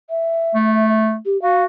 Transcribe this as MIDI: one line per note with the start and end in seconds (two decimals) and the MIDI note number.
0.10 0.89 76
0.55 1.17 57
1.26 1.40 67
1.42 1.66 66
1.42 1.64 77